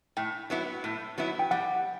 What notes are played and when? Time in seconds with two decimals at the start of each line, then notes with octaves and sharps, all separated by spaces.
0.17 A2 G5
0.50 F#3 B3 E4
0.84 A2
1.18 F#3 B3 E4
1.39 G5
1.51 G3 F#5